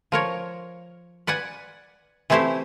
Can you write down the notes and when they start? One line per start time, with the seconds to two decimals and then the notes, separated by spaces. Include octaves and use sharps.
0.12 F3 A#4 C#5
1.27 B4 D5 F#5 G#5
2.30 E3 A3 C4 E4 G4 C5